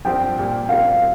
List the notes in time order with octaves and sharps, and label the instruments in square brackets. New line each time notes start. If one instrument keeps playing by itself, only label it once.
[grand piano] G2 F3 C4 G4 C5 [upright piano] G5
[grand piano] A#2 G3 A#3
[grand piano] G3 C4 F4 A#4 [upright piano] F5